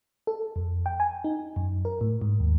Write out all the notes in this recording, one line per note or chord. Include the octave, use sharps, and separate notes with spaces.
A4
F2
G5
G#5
D#4
F#2
A#4
A2
G#2
D#2